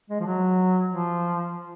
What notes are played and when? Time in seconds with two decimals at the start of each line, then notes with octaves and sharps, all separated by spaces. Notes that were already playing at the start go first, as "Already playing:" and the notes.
0.10 G#3
0.20 F3
0.26 F#3
0.90 F3